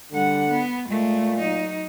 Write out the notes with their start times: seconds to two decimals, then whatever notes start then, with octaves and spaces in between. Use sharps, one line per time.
0.12 D3 G3 F#5
0.50 B3
0.88 A#2 G#3 A3
1.39 F#3 D#4